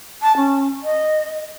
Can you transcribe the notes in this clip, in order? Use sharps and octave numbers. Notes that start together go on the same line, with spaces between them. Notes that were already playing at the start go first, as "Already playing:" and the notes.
A5
C#4
D#5